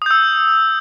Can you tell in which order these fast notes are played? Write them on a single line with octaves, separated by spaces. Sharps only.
D#6 G6 E6